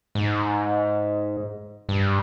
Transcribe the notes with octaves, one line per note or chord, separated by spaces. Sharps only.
G#2
G2